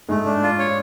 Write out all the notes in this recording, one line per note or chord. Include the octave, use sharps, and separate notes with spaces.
G#2 G#3 A3
D4
F4
C#5